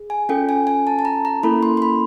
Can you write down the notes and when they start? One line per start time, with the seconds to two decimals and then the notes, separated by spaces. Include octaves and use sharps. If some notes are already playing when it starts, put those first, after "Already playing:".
Already playing: G#4
0.10 G#5
0.29 C#4 F4 A4 G5
0.49 G#5
0.67 G#5
0.87 A5
0.99 A5
1.05 A#5
1.25 A#5
1.43 A#3 C#4 E4 A4 B5
1.63 C6
1.77 C6
1.82 B5